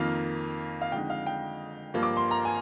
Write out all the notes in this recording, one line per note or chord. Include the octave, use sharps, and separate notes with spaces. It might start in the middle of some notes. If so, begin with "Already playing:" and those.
Already playing: F2 D#3 A#3 F4 F5
F5
F2 D3 G#3 D#4 G5
F5
G5
G2 F3 A#3
D6
C6
A#5
G#5